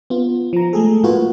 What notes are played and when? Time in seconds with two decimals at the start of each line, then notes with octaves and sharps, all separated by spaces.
0.10 B3 F4
0.53 F3 A#5
0.73 G#3 A3 G#4 A4
1.03 A2 A#3 F4 F#4 B4